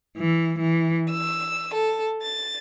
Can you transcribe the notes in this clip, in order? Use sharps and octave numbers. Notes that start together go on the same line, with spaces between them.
E3
E3
E6
A4
A6